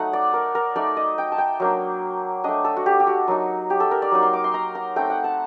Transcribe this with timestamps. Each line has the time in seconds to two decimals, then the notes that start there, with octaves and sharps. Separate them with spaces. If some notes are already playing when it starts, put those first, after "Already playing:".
Already playing: F#3 A3 D#4 F#5
0.13 D5
0.34 A#4
0.55 A#4
0.76 A3 D#4 D5
0.97 D#5
1.18 G5
1.32 A5
1.38 G5
1.60 F#3 A#3 D4
2.44 A3 D4 D#5
2.64 A4
2.77 F#4
2.86 G4
3.00 G4
3.07 F#4
3.28 F#3 A#3 D#4
3.70 G4
3.80 A4
3.91 A#4
4.02 D5
4.12 F#3 A#3 D#4
4.22 C6
4.33 D6
4.44 C6
4.54 A#5
4.75 A#5
4.96 A3 C4 D#4 G5
5.10 F#5
5.24 A5